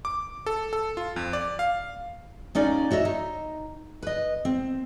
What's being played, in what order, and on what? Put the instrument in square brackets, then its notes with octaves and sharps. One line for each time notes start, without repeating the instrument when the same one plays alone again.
[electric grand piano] D6
A4
A4
F4
F2
D5
F5
[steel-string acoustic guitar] D#2 C#4 D#4 D5
F#4 C#5 D#5 E5
D#4
B4 D#5
C4